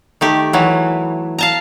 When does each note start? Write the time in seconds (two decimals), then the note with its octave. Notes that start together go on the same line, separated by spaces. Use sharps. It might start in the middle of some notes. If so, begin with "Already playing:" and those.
0.21 D#3 A3 G4
0.53 E3 F#3
1.39 F5 A5 A#5